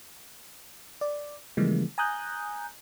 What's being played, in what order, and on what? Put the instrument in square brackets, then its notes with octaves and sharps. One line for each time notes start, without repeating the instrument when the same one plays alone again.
[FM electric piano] D5
C#3 E3 F3 G3 G#3 A#3
G#5 A#5 D#6 F#6 G6